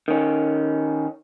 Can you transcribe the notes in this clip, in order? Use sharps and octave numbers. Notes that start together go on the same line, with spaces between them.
D#3 C#4